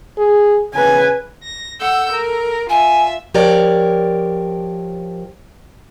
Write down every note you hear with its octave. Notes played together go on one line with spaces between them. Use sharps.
G#4
C#3 B4 G#5
A#6
A4 F#5 E6 G6
A#4
F4 E5 G#5
F3 G4 A#4 C#5 D5